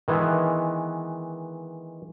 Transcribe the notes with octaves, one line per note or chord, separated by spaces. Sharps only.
D#3 E3 G#3 B3